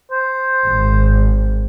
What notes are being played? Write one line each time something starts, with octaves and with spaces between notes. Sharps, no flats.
C5
G#1